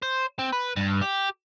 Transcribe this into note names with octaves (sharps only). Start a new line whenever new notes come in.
C5
C4
B4
G2
G4